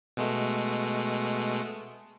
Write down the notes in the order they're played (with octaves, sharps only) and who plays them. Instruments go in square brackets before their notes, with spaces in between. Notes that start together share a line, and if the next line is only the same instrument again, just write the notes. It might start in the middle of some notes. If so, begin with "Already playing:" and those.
[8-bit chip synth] B2 G#3 A3